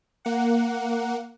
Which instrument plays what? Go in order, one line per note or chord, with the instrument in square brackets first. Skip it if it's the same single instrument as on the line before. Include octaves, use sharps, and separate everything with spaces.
[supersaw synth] A#3 F#5